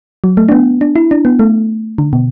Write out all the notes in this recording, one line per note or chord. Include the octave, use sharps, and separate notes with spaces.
F#3
A3
D4
B3
D4
E4
D4
B3
A3
D3
B2